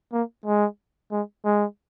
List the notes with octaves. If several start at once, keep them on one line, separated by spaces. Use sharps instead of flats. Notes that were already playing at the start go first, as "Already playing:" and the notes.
A#3
G#3
G#3
G#3